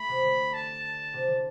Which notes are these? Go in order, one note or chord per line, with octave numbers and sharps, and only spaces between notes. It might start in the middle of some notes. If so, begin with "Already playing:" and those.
Already playing: A3 B5
C3
D3
A5
C3
D3